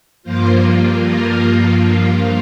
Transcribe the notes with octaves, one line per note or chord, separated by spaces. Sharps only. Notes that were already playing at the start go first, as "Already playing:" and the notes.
G2 F3 A#3 F4 C5
A#4